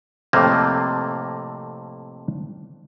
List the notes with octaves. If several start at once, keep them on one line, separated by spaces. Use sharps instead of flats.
F2 A2 C3 A3 A#3 C4